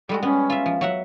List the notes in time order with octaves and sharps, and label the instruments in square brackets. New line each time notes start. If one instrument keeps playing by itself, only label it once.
[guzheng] G3 G#3 F#4 [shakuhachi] A4
[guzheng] B3 [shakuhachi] C#4
[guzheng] F4 E5
F3
F#3 E5 F#5